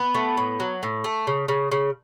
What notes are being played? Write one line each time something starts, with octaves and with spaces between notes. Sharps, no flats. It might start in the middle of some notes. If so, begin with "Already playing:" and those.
Already playing: B3
A3
A2
F#3
A2
A3
C#3
C#3
C#3